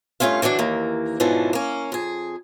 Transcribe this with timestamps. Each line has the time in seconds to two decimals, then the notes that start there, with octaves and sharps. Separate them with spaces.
0.20 G2 A3 C#4 F4 F5
0.42 D3 E3 F#3 D4 F#4
0.59 D#2 E3 A#3
1.20 G#2 B2 E3 F3 C#4 D4
1.53 A#3 C#4
1.92 F2 G#4